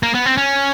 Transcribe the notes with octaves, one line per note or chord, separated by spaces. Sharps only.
A#3
B3
C4
C#4